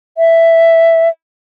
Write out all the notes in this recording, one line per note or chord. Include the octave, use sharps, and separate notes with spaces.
E5